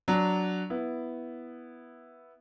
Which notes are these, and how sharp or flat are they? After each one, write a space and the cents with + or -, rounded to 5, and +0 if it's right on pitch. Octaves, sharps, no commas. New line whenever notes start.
F#3 +0 D4 -10
B3 +0 E4 +0